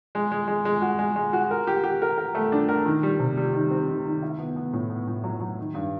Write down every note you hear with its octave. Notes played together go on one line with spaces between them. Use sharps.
G#3
G#3
G#3
G#3
F#4
G#3
G#3
F#4
A#4
G4
G4
A#4
A#4
A3
D4
A#4
D#3
G3
C3
G3
D#3
C4
D#3
D#3
E4
B3
B3
A2
B3
A2
F#3
F#3
D#3
G2